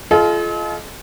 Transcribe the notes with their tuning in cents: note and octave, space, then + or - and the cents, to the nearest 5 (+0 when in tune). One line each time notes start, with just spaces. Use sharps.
F4 -15 A4 -45 D#5 +0